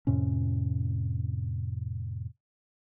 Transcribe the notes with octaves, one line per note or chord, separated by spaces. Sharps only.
F2 A2 C3 C#4